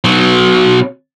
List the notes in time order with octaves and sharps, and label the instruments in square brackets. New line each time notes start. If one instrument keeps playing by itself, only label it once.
[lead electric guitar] B2 F#3